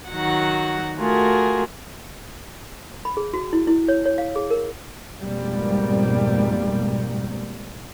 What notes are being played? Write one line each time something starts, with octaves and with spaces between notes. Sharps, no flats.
D#3 F#3 F#4 F#5
A3 F4 F#4 G#4 A#4
B5
G#4
F#4
E4
E4
C#5
C#5
F5
G#4
A#4
F2 G#2 B2 G3 A#3